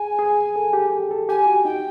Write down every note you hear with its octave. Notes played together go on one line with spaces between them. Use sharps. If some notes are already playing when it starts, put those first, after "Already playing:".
Already playing: G#4 G#5
G#4
A4
G4
G#4
A4
G4 G#5
F#4
D#4 G5